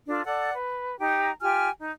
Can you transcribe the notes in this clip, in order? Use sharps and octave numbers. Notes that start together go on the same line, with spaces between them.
D4 F4 A4
A4 D5 F#5
B4
D#4 G4 A#5
F4 G4 G#5 F6
D#4